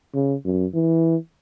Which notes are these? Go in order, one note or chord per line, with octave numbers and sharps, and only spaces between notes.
C#3
F#2
E3